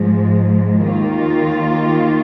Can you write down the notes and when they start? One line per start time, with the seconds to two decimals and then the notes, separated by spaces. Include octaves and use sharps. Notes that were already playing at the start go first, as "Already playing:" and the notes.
Already playing: G#2 F3 G#3
0.85 D#2 D#3 A#3 F4